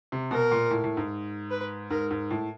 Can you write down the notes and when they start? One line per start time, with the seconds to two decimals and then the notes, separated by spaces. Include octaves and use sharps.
0.12 C3
0.31 B2 A#4
0.51 A#2
0.71 A2
0.84 A2
0.97 G#2
1.50 B4
1.90 G#2 A#4
2.11 G#2
2.31 A2